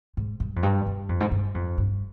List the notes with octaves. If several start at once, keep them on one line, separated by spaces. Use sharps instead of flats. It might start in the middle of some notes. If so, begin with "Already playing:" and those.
G#2
G2
F2
G2
G2
F2
G#2
G2
F2
G2